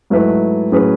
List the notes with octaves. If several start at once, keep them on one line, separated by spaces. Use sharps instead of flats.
G#2 F#3 A3 E4 B4
A2 F#3 C#4 G#4 B4